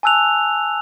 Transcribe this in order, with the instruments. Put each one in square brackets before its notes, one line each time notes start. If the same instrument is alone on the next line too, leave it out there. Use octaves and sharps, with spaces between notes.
[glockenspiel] G#5 A5 E6 F#6 F7